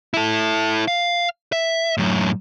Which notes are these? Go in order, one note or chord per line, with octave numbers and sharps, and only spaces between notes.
E4 A4
F5
E5
F#2 A2